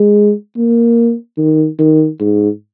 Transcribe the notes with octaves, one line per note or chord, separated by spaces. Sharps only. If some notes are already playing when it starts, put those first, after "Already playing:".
Already playing: G#3
A#3
D#3
D#3
G#2